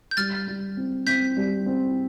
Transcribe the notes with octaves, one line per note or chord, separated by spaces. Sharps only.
G6
G3 F6 A6
G3
C4
C4 G6 B6
G3
C4